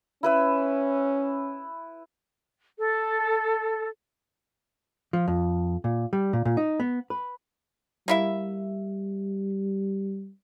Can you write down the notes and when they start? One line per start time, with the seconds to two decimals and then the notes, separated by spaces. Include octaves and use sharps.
0.23 C#4 E4 B4 E5
2.78 A4
5.13 F3
5.28 F2
5.84 A#2
6.13 G3
6.33 A#2
6.45 A#2
6.57 D#4
6.80 B3
7.10 B4
8.08 G3 A#3 E4 E5